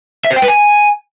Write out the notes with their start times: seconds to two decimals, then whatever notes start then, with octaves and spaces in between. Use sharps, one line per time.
0.25 E5
0.30 C5
0.36 G5
0.42 B4
0.48 G#5